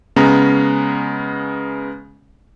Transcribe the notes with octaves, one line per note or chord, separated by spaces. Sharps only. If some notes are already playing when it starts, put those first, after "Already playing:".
C#3 G#3 B3 C#4 A#5